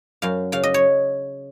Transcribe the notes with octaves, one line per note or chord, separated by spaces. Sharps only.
F#2 F5
C#3 F5
D#5
C#5